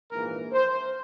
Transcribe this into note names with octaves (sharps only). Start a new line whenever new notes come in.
A#1 G#2 E3 A#3 A#4
C5